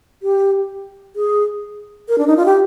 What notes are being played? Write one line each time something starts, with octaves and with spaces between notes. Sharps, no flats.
G4
G#4
A#4
D4
D#4
F4
G4